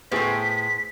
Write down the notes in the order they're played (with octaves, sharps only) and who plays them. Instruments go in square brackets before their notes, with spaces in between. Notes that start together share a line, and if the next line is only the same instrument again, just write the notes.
[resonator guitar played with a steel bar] A2 C5 [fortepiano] B3 G#4 A4 [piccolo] B6